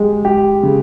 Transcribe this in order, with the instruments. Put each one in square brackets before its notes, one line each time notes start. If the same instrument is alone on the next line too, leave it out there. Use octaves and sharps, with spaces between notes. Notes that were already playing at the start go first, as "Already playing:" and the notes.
Already playing: [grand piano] G#3 G4
G4
C#3